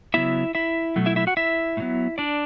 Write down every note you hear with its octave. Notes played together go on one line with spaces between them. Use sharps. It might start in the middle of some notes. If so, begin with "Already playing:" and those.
C#3 F#3 B3 E4 E5
E4 E5
B2 F#3 A3
E4 E5
E4 E5
F#4 F#5
E4 E5
A2
F#3 B3
D4 D5